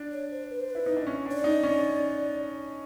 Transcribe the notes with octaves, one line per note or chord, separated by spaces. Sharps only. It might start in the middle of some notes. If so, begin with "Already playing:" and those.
Already playing: D4
C#5
C5
B4
C5
E4 B4
D#4
D4
C#4
D4 C#5
D5
D#4
C#4